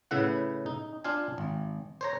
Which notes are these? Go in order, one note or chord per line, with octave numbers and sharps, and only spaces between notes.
A2 C#3 E4 B4 F#5
D#4
D4 F4 F5 G#5
G#1
C5 C#5 A#5